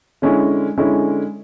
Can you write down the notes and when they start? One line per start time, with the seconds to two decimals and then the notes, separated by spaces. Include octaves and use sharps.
0.22 D3 G#3 C#4 E4
0.78 D3 G#3 C#4 E4